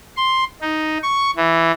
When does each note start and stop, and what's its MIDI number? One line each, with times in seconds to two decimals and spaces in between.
0.17 0.44 84
0.61 0.98 63
1.03 1.31 85
1.36 1.72 52